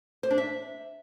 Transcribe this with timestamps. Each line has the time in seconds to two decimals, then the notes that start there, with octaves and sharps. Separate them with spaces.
0.23 C5
0.31 D4
0.38 E5